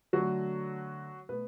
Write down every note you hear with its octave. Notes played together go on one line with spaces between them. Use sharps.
D3 F#3 A3 F#4
B2 A3 B3 B4